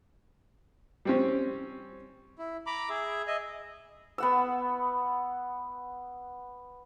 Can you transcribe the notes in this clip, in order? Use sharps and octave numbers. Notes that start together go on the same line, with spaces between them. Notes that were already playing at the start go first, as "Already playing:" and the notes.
G3 C4 C#4
E4
A#5 B5 D6
G#4 E5
D#5 E5
B3 F#5 E6